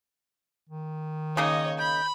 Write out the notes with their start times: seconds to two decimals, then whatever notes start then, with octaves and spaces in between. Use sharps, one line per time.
0.69 D#3
1.37 C#3 A#3 D#4 C#5 D#5 D#6
1.79 B5 G6